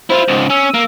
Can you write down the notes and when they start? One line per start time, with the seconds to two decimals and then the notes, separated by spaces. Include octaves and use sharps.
0.10 E4 F4 C5
0.28 C#2 G#2
0.50 C#4 E6
0.74 A#3